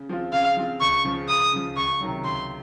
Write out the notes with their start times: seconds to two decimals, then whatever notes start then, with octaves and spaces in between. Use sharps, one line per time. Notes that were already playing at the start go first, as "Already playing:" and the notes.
Already playing: C#3
0.09 F3 C4 F4
0.33 C#3 F5
0.57 F3 C4 F4
0.81 C#2 C#6
1.04 C#3 F3
1.28 C#2 D#6
1.53 C#3 F3
1.76 C#2 C#6
2.00 C3 D#3 F#3
2.24 C#2 C6